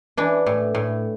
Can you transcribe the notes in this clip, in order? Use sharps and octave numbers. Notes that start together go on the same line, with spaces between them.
E3 D4
A2
A2